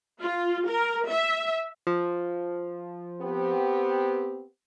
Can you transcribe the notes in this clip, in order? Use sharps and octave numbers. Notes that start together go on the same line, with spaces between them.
F4
A#4
E5
F3
B3 C4 G4